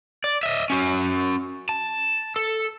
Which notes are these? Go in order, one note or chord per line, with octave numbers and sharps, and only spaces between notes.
D5
D#5 E5
C#4 F#4
A5
A4